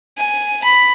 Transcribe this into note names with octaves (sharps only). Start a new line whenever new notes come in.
G#5
B5